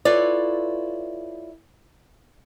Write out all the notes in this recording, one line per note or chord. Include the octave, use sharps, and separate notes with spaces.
E4 F4 A4 B4 C#5 D5